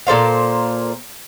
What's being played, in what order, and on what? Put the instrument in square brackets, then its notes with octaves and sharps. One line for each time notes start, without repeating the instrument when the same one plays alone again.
[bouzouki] A#2 A4 C5 F5